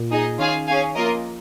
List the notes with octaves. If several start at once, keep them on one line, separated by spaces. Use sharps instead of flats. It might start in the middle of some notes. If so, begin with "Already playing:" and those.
Already playing: A#2
D#4 G#4 D#5
D#3 C#4 F4 G#4 F5 G#5
C#4 G#4 F5 G#5
F3 A#3 F4 A#4 D#5